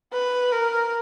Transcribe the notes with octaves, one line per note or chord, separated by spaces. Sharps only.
B4
A#4